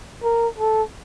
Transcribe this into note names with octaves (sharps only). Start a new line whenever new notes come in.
A#4
A4